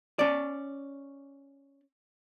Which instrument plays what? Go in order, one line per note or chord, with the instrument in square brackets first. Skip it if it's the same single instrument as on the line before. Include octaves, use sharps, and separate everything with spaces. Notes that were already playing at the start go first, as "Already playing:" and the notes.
[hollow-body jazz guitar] C#4 D5